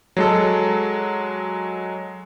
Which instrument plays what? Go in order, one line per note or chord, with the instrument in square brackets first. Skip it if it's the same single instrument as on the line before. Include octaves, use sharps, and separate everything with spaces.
[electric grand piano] F#3 G#3 A4